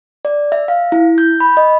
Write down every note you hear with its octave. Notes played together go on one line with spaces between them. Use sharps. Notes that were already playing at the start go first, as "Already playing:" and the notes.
D5
E5
F5
E4
G6
B5
D#5